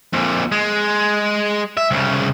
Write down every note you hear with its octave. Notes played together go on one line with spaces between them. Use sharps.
F2 A#2
G#3
E5
C2 C#3